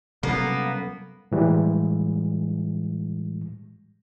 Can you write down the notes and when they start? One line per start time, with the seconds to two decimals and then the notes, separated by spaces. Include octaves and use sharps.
0.23 C3 F#3 G3 A#3 B3 C#4 A4
1.32 A2 E3 G3 G#3